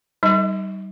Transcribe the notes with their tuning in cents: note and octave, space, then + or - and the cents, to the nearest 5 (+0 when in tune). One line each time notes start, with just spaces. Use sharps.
G3 -30 D#4 +5 D#5 +0